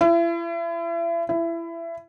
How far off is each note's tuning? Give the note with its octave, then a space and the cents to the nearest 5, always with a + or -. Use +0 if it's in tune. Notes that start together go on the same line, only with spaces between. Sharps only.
E4 +40
E4 +25